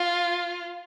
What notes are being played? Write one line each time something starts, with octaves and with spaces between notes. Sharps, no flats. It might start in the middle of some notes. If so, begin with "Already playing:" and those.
Already playing: F4